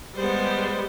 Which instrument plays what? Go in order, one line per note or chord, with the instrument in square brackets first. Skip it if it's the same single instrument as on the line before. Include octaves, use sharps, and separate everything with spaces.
[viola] G3 G#3 [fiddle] B3 C5